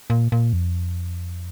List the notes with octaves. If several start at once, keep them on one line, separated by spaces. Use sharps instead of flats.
A#2
A#2
F2